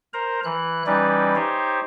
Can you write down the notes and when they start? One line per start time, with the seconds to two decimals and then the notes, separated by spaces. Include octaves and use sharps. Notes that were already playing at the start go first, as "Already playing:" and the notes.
0.13 A#4 C5 A#5
0.45 E3 F#6
0.87 E3 G3 C#4 D#4 B4 D5
1.36 D#4 G4 C5 C#5